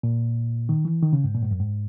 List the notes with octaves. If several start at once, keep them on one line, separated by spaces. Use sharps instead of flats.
A#2
D#3
E3
D#3
C#3
G#2
A#2
G#2
F#2
G#2